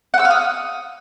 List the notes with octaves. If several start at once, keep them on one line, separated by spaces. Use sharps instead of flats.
F#5
E6
F5
D#6